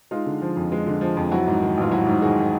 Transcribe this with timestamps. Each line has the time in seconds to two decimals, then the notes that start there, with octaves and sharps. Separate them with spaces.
0.11 G#3 D#4 F4
0.26 D3
0.42 F3
0.57 F2
0.72 G#3
0.87 D3
1.01 F3
1.17 F2
1.31 F#3 E4 F#4
1.47 G#2
1.62 D#3
1.77 A1 F4
1.91 F#3 E4 F#4
2.06 G#2
2.22 D#3 F#4 G#4